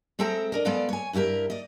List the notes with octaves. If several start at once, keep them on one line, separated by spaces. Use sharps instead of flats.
G#3 C4 A4 E5 G5 A#5
D4 A#4 D#5
G#3 B3 A4 B4 D5 F5
C#5 G#5
G2 E4 F#4 G4 A#4
D5 D#5